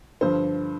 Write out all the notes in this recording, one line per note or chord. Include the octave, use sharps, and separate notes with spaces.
G2 D3 F3 C5